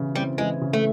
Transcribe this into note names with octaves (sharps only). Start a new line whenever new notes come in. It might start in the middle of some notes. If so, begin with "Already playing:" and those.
Already playing: C#3 E3
G3 C4
E3 G#3
C#3
A3